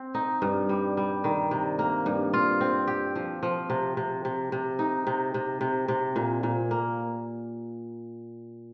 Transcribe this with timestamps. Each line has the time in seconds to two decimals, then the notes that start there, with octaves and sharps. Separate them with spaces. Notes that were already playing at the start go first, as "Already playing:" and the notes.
Already playing: C4
0.15 D#4
0.42 G2
0.69 G3
0.97 G3
1.24 D#3
1.51 C3
1.79 A#3
2.06 G2
2.34 F4
2.61 C4
2.87 G4
3.15 F3
3.43 F3
3.70 C3
3.97 C3
4.25 C3
4.52 C3
4.79 D#4
5.07 C3
5.34 C3
5.61 C3
5.88 C3
6.16 A#2
6.43 A#2
6.71 A#3